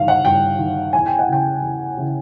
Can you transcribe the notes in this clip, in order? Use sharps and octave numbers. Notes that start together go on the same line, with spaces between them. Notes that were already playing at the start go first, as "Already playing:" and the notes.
Already playing: G2 D#3 F5
F#5
G2 G5
D#3
E2 G#5
G5
F#5
C#3 E3 G5
E2
C#3 E3